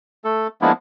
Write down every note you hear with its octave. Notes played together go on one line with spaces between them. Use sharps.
A3 A4
F3 G#3 A#3 B3 D4 E4